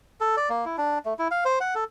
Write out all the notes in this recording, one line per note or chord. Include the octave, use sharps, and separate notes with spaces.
A4
D5
A#3
E4
D4
A3
E4
F5
C5
F#5
A4